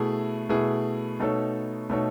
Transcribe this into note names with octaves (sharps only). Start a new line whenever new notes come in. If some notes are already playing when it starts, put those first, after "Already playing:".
Already playing: B2 A3 E4 G#4
B2 A3 E4 G#4
B2 A3 D#4 A4 C#5
B2 A3 D#4 A4 C#5